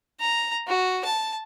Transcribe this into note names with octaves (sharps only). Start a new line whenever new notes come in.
A#5
F#4
A5